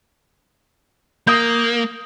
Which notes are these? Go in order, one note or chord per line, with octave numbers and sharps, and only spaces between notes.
A#3 D#6 G6